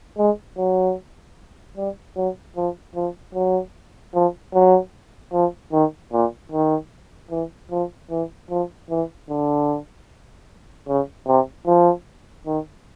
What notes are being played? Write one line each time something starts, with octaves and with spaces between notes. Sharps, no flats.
G#3
F#3
G3
F#3
F3
F3
F#3
F3
F#3
F3
D#3
A#2
D#3
E3
F3
E3
F3
E3
D3
C#3
C3
F3
D#3